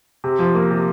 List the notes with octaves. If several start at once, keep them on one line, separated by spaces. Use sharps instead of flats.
C3
F3
A#3
C3